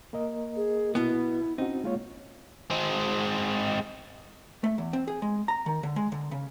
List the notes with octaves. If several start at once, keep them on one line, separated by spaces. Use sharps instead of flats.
A#3 A#4 D#5
G#4
B2 B3 E4
C4 C#4 D#4 F#4
G#3 A#3 F4 C#5
G#3 C4
A3
E2
C4
G#4
G#3
A#5
D#3
D3
G#3
D3
C#3